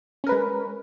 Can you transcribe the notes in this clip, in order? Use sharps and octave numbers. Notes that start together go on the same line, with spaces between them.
G#3 C#4 A#4 B4